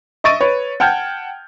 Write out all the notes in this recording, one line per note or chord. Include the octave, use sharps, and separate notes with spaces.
D#5 E5 C#6 A6 D7 D#7
B4 C#5
F#5 G5 A5 F6 G6 G#6